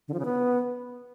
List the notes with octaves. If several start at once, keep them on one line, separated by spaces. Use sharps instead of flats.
D3
F3
C#3
B3